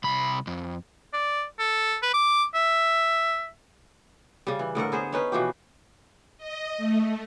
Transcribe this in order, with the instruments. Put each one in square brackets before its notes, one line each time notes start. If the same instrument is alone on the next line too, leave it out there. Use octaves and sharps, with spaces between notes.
[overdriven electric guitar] C2 B5
F2
[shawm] D5
A4
B4
D6
E5
[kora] C#3 G3
E3
A2 D3 A#4 F#5
B3 G#4 C5
C#4 D#4 B4
B2 E3 F3 G4
[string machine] D#5
A3